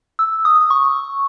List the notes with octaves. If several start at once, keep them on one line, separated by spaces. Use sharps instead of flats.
E6
D#6
C#6